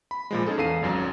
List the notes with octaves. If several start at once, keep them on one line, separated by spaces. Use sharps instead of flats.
B5
A#2 F3 G#3
C#4 D#4 G#4 A4
E2 A4 F5 C7 D#7
G#1 F#2 F#3